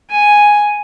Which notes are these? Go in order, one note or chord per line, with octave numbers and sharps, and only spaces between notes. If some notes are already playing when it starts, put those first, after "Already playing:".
G#5